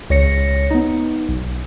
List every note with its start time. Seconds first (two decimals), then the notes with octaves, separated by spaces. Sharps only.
0.10 C#2 C#5 A#6 C#7
0.71 B3 D#4
1.29 B1